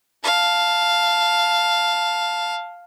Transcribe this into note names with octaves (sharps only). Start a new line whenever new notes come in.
F5 A5